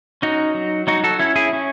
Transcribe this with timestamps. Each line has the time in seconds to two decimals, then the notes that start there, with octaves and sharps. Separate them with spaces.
0.22 C#4 D#4 F#4
0.54 F#3
0.87 F#3 D#4 F#4
1.04 F#4 A4
1.19 C#4 E4
1.36 E4 G#4
1.53 C#4